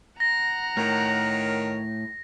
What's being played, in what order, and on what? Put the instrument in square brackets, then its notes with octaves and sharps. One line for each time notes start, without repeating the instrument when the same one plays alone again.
[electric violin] F#5 A#5 [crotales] A#6
[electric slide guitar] A2 [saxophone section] D#3 A#4 C#5